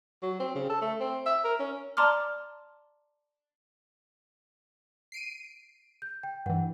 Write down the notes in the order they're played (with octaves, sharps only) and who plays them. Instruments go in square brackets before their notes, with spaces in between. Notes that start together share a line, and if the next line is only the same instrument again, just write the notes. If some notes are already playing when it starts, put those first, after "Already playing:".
[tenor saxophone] F#3
C4
C#3
A4
A3
C4
E5
A#4
C#4
[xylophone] D5 A5 A#5 C6 D6 F6
[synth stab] C7 D7 D#7
[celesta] G6
G5
[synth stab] G2 E3 [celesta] F#5